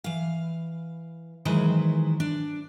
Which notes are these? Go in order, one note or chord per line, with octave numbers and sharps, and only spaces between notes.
E3 F5
D#3 E3 F#3 G#3 B4 C5
D4